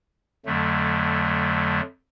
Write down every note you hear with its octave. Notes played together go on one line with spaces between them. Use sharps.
F2 D3 F#3 A3